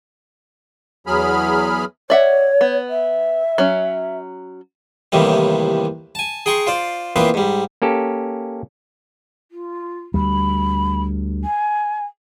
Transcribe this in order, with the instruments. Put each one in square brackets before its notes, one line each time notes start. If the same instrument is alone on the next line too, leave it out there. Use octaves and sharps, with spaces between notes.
[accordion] E2 F#3 G#4 B5 F6
[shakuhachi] C#5 [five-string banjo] D5 E5 F#5
[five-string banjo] B3
[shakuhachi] E5
[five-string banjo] F#3 C#4
[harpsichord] D#2 A2 C3 D#3 E3 G3
G#5 A5
G#4 G5 A#5 C6 C#6
F4 C5 D5
A#2 E3 B3 C4 F5 C6
G#2 G3
[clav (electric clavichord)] A#3 C#4 G4 A4
[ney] F4
[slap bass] D2 G3 [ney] B5
[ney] G#5